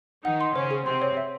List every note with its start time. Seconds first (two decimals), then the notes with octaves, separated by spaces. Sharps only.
0.24 D#3 D#4 F#5
0.41 C6
0.55 C#3 C#4 C5
0.71 G#4
0.85 C3 C4 C6
1.02 C#5
1.17 E5